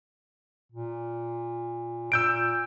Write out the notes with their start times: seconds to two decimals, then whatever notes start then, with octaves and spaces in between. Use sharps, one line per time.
0.72 A#2
2.12 A#2 E6 G6 D7